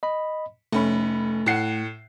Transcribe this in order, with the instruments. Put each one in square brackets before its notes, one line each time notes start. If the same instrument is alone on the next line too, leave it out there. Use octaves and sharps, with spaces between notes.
[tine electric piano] D#5 B5
[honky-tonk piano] F1 C#4 B5 [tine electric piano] A3
[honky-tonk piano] A2 F#5 C7